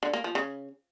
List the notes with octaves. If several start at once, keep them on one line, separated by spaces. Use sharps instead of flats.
D3
A#3
F3
C#3